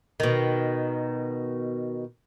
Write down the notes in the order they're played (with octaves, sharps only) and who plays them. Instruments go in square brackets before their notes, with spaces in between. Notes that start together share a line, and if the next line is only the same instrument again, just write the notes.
[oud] B2 D#3